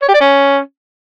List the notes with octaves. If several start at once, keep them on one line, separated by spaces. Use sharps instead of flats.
C#5
G4
D5
C#4